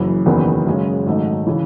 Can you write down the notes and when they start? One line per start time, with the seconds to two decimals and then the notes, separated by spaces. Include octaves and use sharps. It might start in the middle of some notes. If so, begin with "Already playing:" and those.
Already playing: F#1 F#2 E3
0.26 F#1 E2 D#3 F#3 B3
0.66 F#2 C#3 G#3 C#4
1.06 G#1 G#2 F#3 A3 D#4
1.47 C#3 E3